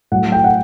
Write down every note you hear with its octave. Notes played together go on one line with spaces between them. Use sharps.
A2 F#3 F#5
G5
F#5